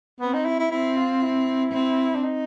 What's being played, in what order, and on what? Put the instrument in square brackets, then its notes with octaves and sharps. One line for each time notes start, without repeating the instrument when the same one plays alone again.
[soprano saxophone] B3 [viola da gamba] C4
[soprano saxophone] D#4
E4
E4
[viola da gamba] C4 [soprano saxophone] E4
[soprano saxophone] F4
E4
[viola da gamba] C4
[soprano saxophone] D4
D#4